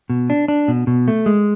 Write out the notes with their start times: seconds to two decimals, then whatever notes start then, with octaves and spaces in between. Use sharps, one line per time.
0.10 B2
0.30 D4
0.48 D4
0.68 B2
0.87 B2
1.08 A3
1.26 G#3